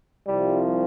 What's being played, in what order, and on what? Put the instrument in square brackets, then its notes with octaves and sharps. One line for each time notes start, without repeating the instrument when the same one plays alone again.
[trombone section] C2 C3 F3 G3